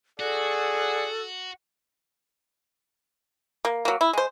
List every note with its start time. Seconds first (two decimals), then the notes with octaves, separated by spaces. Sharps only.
0.20 F#4 G#4 A4 D5 F#5
3.65 A#3
3.85 F#3 A#3
4.01 E4
4.13 G#3 C5